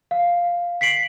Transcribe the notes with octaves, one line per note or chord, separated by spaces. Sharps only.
F5
B6 C7 D7 F#7